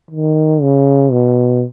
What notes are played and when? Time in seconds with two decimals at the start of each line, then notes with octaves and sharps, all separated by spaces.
0.11 D#3
0.62 C#3
1.12 B2